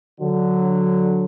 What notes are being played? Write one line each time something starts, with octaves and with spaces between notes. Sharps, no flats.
D3 F#3